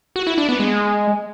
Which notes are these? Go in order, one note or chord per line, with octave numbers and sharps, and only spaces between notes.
F#4
E4
D4
B3
G#3